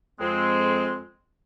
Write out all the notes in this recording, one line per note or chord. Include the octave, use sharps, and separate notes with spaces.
F2 G#3 C4